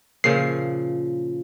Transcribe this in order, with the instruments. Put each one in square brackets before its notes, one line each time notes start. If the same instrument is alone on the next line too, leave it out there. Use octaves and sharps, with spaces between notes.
[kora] A#2 C#3 F3 [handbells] C7